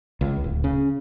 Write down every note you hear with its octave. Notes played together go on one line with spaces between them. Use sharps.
C#2
D1
C#3